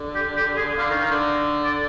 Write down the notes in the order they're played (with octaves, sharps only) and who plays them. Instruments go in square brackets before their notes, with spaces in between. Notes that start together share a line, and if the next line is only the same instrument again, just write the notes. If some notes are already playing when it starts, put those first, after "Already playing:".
Already playing: [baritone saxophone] D3
[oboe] G4
G4
G#4
[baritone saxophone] D3 [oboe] F5
[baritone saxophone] D#3
D#3
D3
[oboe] D5